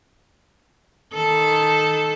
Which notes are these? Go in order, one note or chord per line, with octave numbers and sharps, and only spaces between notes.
D#3 A4